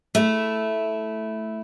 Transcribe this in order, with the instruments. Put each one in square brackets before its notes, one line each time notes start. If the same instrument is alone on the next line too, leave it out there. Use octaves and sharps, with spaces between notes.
[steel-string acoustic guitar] A3 E4